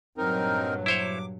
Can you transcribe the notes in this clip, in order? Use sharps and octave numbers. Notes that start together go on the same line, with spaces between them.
G2 A#2 F#3 C4 D#4 A#4
E4 C5 C#5 D6